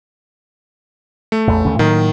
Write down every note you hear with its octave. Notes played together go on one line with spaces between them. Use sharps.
A3
A1 E2
D#2 D3 C#4
A2 D#3 F#3 A#3